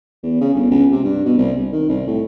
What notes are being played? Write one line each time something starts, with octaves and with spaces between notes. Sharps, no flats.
E2
C#3
G1
C#2
C3
G2
B2
C2
C2
D#3
C2
A2